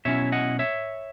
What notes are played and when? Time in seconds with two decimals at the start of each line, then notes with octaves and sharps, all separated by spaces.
0.05 B2 F#3 C#4 E4 C#5 E5
0.32 D#5 F#5
0.59 C#5 E5